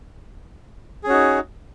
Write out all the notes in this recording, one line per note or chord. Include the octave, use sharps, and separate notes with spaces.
C#4 D#4 F#4 G#4